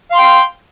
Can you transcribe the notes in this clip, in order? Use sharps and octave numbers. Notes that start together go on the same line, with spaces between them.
F5 G5 C6